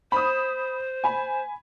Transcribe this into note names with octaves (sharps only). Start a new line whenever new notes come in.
C5 B5 D#6
G#5 B5